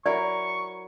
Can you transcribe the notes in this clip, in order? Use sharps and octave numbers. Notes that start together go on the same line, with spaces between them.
F#3 E4 A#4 D5 C#6